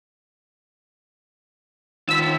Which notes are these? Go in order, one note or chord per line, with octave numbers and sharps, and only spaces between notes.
D#3 F4 E6 B6